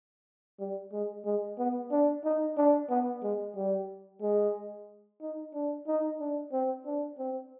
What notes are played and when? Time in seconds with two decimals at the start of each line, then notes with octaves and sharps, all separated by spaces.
0.60 G3
0.92 G#3
1.25 G#3
1.58 B3
1.91 D4
2.24 D#4
2.57 D4
2.90 B3
3.23 G#3
3.56 G3
4.22 G#3
5.21 D#4
5.54 D4
5.87 D#4
6.20 D4
6.52 C4
6.85 D4
7.18 C4